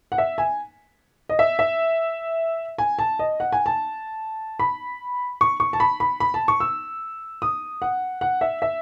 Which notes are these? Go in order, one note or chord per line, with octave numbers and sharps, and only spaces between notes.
F#5
E5
G#5
D#5
E5
E5
G#5
A5
D#5
F#5
G#5
A5
B5
C#6
C#6
A5
B5
B5
B5
A5
C#6
E6
D#6
F#5
F#5
E5
E5